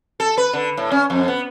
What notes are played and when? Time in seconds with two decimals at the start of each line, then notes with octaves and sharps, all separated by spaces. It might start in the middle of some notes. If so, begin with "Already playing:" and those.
0.20 A4
0.37 B4
0.53 D3
0.77 A2
0.92 C#4
1.10 F2
1.28 B3